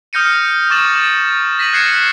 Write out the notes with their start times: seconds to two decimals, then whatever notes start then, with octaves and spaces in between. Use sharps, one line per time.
0.13 D#6 F6 G6 A#6 C#7 D#7
0.70 C#6 D6 A6 E7 F#7
1.59 A#6 B6 D#7 F#7
1.73 F#6 G#6 C7 C#7 E7